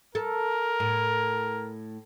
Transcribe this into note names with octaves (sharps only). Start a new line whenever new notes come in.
A4 A#4
A2